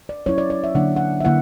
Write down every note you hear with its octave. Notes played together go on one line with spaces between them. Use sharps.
D5
F#3 C#4 E4 C#5
D5
D5
E5
D3 F#3 A#3 D4 F#5
F#5
E5
D3 A#3 E4 F#5